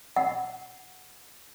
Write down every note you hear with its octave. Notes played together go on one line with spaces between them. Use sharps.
F#5